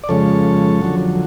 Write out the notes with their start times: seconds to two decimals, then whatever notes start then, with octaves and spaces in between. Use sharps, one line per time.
0.04 D5
0.09 F2 C#3 G#3 A4 C#5
0.81 F2 D3 F#3